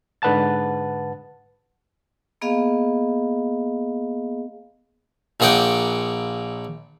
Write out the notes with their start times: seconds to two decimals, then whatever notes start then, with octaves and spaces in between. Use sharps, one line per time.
0.22 G#2 D3 B4 F#5 A5 A6
2.41 A#3 B3 G#4 D#5 F5
5.40 A#1 A#2 G#4 F#5 G5 D6